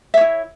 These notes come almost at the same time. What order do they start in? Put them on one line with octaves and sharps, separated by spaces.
E5 C#5 E4